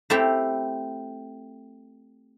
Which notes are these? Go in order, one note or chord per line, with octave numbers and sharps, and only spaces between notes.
A3 C4 E4 G4